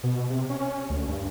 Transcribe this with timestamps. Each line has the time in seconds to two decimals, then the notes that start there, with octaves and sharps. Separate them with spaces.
0.03 B2
0.30 C3
0.50 C#4
0.90 D2
1.08 G2